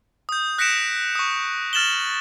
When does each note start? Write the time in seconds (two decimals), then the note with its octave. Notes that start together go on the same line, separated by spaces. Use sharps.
0.29 D#6 G6
0.58 F#6 A#6 B6 C#7 D7 E7
1.15 C#6 D#6
1.73 F6 A6 E7 F#7 G7